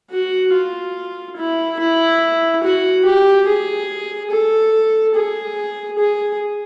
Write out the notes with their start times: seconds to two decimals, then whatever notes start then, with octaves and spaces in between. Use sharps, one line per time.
0.11 F#4
0.53 F4
1.36 E4
1.79 E4
2.63 F#4
3.05 G4
3.47 G#4
4.31 A4
5.15 G#4
5.98 G#4